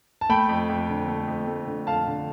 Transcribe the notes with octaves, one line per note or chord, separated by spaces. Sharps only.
A5
A3 G5 B5
F2
F2
D3
A3
F2
A3
D3
F2 F5 A5
D3